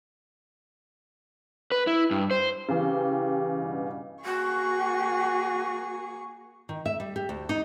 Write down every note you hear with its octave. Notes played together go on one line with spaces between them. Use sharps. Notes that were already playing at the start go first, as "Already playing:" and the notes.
B4
E4
G2
C5
C#3 E3 G4
G2 B2
A#3 F#4 G#4 C#6
D#3
E5
G3
G4
D2
D#4